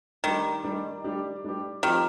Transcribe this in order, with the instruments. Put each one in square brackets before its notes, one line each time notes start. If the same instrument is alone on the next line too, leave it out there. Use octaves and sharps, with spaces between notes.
[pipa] D#3 [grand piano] G3 D4 G4
[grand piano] G3 D4 G4
G3 D4 G4
G3 D4 G4
[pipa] D#3 [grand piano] F3 C4 G4